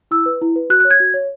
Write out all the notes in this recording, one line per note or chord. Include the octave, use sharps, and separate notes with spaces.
E4 E6
B4
E4
B4
F#4 F#6
F#6
C#5
G#6
F#4
C#5